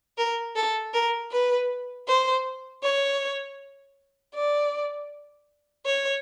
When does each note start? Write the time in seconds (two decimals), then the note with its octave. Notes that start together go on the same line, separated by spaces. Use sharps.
0.17 A#4
0.56 A4
0.93 A#4
1.31 B4
2.07 C5
2.83 C#5
4.34 D5
5.85 C#5